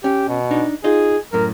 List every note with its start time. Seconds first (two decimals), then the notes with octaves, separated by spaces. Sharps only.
0.04 C#4 G4
0.28 B2
0.51 D4 D#4
0.84 D#4 F4 G#4 D#5
1.33 F#2 A2 A#4